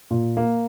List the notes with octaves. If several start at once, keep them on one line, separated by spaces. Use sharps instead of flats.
A#2
A#3